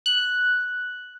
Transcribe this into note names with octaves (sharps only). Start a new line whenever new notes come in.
F#6